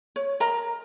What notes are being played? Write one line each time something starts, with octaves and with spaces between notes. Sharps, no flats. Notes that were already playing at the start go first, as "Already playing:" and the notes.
C#5
A#4 D#5 A#5